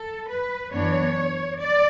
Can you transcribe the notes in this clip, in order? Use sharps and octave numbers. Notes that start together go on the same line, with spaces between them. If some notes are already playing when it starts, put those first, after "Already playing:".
Already playing: A4
B4
F#2 E3 B3 D4 C#5
D5